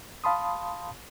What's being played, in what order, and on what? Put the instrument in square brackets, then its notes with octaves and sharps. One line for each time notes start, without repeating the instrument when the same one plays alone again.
[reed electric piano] F5 A5 B5 C6 D#6